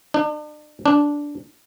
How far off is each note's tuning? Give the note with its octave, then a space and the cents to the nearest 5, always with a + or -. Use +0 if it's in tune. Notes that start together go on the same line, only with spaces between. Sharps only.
D4 +40
D4 -10